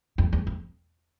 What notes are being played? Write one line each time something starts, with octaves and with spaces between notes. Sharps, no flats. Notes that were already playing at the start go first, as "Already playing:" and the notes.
F2
E2
F2